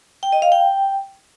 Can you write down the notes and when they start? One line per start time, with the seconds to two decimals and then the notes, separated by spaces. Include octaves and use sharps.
0.23 G5
0.32 D#5
0.42 F5
0.52 G5